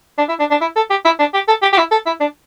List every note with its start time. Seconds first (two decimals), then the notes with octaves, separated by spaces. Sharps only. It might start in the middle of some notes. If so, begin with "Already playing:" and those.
0.18 D4
0.29 E4
0.39 D4
0.51 D4
0.61 E4
0.76 A4
0.90 G4
1.05 E4
1.19 D4
1.34 G4
1.48 A4
1.62 G4
1.73 G4
1.78 E4
1.91 A4
2.06 E4
2.20 D4